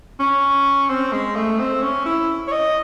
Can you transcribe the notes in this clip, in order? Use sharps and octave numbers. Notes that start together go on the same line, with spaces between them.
C#4
C4
G#3
A3
C4
C#4
E4
C#5
D#5